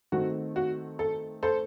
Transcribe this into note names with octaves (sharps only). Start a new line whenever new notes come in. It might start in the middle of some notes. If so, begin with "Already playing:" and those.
D#3 A3 C4 F#4
F#4
A4
A4 C5